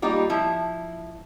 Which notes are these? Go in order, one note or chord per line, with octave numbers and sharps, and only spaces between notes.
G3 A#3 D#4 F4 G4
F3 E4